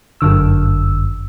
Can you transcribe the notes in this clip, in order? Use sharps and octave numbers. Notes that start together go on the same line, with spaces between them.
G1 F#2 D3 E6